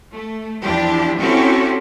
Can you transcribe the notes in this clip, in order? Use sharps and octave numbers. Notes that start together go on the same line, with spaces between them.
A3
E2 F3 D4 E4 G4
C4 C#4 E4 F#4 G4 A4